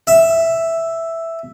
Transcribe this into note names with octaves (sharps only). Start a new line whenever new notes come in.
E5